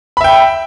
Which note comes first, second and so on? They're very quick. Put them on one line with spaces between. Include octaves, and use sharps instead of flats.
B5 E5 G5